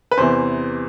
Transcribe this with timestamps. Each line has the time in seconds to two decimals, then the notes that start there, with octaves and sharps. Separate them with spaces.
0.11 B4
0.17 E2 C3 E3 C5